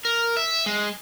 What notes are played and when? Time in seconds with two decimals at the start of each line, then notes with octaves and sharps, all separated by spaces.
0.05 A#4
0.37 E5
0.66 G#3